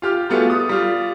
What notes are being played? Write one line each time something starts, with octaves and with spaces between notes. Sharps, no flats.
F4 G4 F6
G3 A3 B3 F4 F#4 G#4
D#6
G3 F4